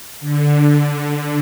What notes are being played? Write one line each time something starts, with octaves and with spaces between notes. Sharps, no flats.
D3
D3